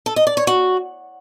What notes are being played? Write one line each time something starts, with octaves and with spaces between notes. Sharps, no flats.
A4
D#5
D5
C#5
F#4